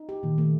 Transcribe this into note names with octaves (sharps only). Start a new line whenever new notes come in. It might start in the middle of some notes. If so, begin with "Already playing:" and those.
Already playing: D#4
G4
A#2 D#3
A3